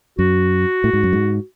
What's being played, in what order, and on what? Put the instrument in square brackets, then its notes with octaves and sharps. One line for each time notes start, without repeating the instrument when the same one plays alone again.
[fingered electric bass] F#2 [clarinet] F#4
[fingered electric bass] A2
G#2
F#2
G#2